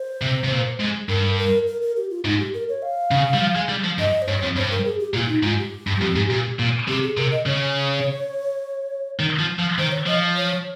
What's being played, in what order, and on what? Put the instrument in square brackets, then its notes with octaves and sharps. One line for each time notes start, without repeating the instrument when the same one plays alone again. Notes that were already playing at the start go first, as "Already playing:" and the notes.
Already playing: [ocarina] C5
[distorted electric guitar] C3
C3
A#2
G#2
[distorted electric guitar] G2 [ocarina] A#4
[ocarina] A#4
A#4
A#4
G4
F4
[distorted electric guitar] G#2 [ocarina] D#4
[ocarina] G4
A#4
C#5
F5
[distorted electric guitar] C#3
G3
F3
G#3
G3
F3
[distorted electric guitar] G2 [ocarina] D#5
[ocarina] C5
[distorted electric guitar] G2 [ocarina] C#5
[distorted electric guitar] F2
[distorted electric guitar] G2 [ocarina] C5
[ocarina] A#4
G#4
G4
[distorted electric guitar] A#2 [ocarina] F4
[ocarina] F4
D#4
[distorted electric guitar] G#2 [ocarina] F4
[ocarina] G4
[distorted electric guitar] G2
F2
G#2
A#2
A#2
[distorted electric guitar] C3 [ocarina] G4
[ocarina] G#4
[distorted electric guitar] C3 [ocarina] A#4
[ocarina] D#5
[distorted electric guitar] C#3 [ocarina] C#5
[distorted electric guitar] D#3
F3
F3
[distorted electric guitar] D#3 [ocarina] C5
[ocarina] C#5
[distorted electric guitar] F3 [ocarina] D#5
[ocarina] C#5